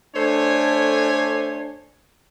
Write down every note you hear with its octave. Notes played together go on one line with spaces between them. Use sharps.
A3 D4 A4 C5 C#5 G#5